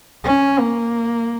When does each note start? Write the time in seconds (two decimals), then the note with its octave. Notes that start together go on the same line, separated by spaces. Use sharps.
0.25 C#4
0.59 A#3